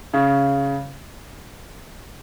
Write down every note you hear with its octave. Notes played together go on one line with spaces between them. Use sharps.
C#3